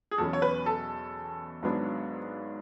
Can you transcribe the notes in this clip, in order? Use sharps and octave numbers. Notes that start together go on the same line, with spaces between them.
G#4
E2 B2 F#3 C#4 A4
C#5
B4
A4
G#1 G#2 F#3 B3 D4